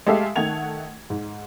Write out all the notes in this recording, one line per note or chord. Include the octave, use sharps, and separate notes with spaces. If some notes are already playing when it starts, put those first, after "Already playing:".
G#3 A3 G4 A4 E5 F5
D#3 A3 F#5 G#6 F7
G#2